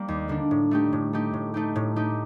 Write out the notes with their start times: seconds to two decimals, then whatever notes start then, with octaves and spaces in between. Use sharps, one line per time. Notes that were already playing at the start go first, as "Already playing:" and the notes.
Already playing: G3 A#3
0.08 D#2
0.28 D3 G3 A#3 D4
0.51 A2
0.71 A3 D#4 G4
0.93 A2
1.13 A3 D#4 G4
1.33 A2
1.54 A3 D#4 G4
1.76 A2
1.96 A3 D#4 G4